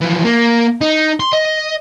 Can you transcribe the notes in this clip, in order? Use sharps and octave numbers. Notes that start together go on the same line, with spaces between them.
E3 F3
A#3
D#4
C6
D#5